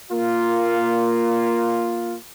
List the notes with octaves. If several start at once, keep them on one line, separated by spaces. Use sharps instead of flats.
A#3 F4